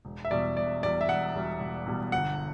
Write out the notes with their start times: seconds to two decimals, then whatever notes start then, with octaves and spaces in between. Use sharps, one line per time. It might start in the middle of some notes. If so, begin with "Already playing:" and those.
0.05 E1
0.25 E5
0.31 E2 B2 G3 D5
0.57 E1 D5
0.83 E2 B2 G3 D5
1.01 E5
1.08 E1 F#5
1.35 E2 B2 G3
1.61 E1
1.86 E2 B2 G3
2.12 G1 F#5